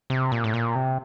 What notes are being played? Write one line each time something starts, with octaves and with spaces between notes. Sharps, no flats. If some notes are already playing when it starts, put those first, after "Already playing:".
C3
A#2
A2
A#2
C3